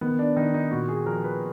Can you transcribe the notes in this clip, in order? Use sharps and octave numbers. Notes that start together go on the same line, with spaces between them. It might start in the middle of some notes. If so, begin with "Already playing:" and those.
D#3 B3
D4
D#3 D#4
D#4
A#2 F#4
G#4
F3 A#4
B4